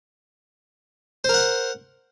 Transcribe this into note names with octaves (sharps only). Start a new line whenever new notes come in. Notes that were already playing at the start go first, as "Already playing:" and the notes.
A#4 C5 F#5